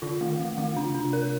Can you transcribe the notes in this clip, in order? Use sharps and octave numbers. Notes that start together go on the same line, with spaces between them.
D3 F4
D#3 A3
E3 A3
D#3 A3
C#3 D4
C3 D4
A#4